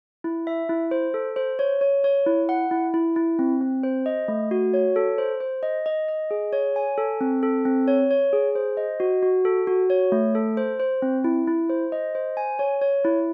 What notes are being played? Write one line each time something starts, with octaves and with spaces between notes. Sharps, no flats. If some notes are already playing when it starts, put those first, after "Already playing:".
E4
E5
E4
C5
A4
C5
C#5
C#5
C#5
E4
F#5
E4
E4
E4
C4
C4
C5
D#5
A3
F#4
C#5
A4
C5
C5
D#5
D#5
D#5
G#4
C#5
G#5
A4
C4
A4
C4
C#5
C#5
G#4
C5
D#5
F#4
F#4
A4
F#4
C#5
A3
A4
C5
C5
C4
E4
E4
C5
D#5
C5
G#5
C#5
C#5
E4